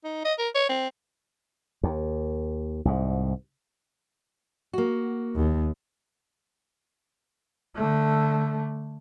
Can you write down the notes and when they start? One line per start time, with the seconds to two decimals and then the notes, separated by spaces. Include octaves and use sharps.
0.04 D#4
0.25 D#5
0.39 A#4
0.55 C#5
0.69 C4
1.83 D#2
2.85 C2 G#2
4.73 A#3 F#4
5.36 D#2
7.76 D3 A3